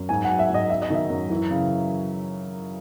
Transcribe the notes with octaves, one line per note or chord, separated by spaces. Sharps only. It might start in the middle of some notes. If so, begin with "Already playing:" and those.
Already playing: F#2
G#2 G#5
F#3 F#5
E5
G#2 D#5
F#3 E5
D#5
D#3 E5
F#2
E3
C#3